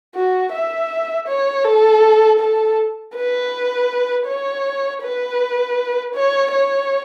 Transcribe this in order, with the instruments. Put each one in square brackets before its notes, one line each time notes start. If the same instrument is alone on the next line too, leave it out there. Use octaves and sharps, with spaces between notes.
[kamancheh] F#4
E5
C#5
A4
A4
B4
C#5
B4
C#5
C#5